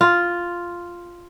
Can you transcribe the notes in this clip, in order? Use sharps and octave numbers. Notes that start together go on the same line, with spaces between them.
F4